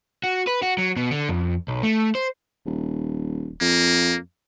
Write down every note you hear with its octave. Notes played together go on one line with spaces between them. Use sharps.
F#4
B4
F#4
F#3
B2
D3
F2
B1
A3
C5
D#1
F2 A#3